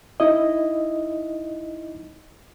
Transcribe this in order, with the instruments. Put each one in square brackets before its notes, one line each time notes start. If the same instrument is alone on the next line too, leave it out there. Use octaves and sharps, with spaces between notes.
[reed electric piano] D#4 E4 D#5